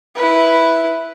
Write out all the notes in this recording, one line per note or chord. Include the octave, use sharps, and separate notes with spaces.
E4 B4